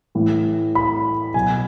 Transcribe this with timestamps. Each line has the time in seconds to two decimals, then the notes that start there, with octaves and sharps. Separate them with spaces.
0.15 A2 E3
0.75 B5
1.34 B2 F#3 G#5